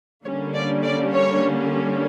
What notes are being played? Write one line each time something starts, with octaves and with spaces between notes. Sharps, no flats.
D3 G3 A#3 C#4 C#5
D5
D5
C#5